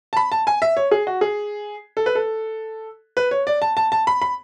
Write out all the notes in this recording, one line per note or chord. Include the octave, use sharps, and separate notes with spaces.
A5
B5
A5
G#5
E5
C#5
G#4
F#4
G#4
A4
B4
A4
B4
C#5
D5
A5
A5
A5
B5
B5